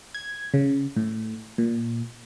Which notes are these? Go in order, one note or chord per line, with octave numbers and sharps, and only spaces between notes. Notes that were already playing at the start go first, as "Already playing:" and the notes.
G#6
C#3
A2
A#2